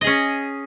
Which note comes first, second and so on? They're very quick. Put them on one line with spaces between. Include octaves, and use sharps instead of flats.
D#5 G#4 C#4